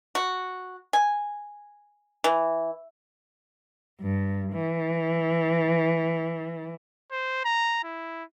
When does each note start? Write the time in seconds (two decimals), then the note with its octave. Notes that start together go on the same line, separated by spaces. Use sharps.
0.15 F#4
0.93 G#5
2.24 E3
4.01 G2
4.53 E3
7.11 C5
7.45 A#5
7.84 E4